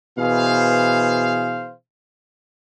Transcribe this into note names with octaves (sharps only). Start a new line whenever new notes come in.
B2 E3 G#4 C5 F5